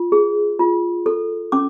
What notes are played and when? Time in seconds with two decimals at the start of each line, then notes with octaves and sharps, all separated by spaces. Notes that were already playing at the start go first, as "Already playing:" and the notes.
Already playing: F4
0.12 G#4
0.59 F4
1.06 A4
1.52 C#4 D6